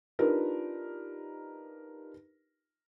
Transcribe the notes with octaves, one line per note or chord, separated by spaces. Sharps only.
D4 D#4 F4 G4 A#4 B4